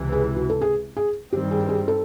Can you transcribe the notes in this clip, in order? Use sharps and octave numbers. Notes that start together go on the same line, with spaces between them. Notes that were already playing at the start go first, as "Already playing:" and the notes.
Already playing: C#2 C3 E3
G#4
F#4
A4
G#4
G#4
G2 D#3 G3 C4 G4
G#4
G#4
A4